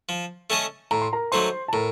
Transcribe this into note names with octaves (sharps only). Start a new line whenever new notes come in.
F3
A3 C#4 A4 D#5
A2 A#5
C6
A#4 A#5
F#3 A3 D#4 C5 C6
A5
A2 A#4 A#5